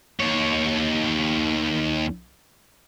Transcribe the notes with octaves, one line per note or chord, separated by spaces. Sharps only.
D#2 C#5